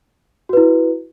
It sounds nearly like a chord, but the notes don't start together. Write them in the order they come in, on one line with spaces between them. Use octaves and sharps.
F#4 B4 E4